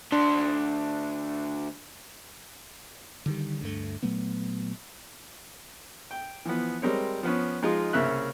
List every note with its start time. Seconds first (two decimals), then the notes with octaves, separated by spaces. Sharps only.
0.12 D2 D4 C6
3.26 D3 D#3 G3
3.61 D2 G2 A3
4.03 A#2 F#3 A3 B3
6.11 G5
6.45 E3 F3 B3
6.82 G3 G#3 C4 A#4 C#5
7.23 F3 B3 C#4
7.62 F3 G#3 D#4 F4 G#4
7.93 C2 C#3 A#3 C#4 E5 F#6